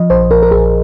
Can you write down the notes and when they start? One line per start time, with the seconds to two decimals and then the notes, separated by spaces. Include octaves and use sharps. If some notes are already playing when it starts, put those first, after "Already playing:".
Already playing: F3 D#5
0.10 A#1 C5
0.30 A#1 A#4
0.43 A#4
0.51 A#1 G#4